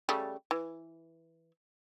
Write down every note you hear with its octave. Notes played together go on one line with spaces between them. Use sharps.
C#3 G3 A3
E3